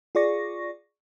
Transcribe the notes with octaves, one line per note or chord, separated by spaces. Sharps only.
F4 G#4 D5 C#6 A#6